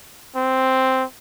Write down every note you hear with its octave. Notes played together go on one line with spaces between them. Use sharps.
C4